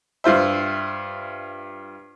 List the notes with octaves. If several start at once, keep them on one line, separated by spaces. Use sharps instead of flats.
G2 F4 C5 E5